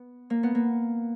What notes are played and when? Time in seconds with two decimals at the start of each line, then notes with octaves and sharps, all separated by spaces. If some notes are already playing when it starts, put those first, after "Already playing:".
Already playing: B3
0.30 A#3
0.43 B3
0.55 A#3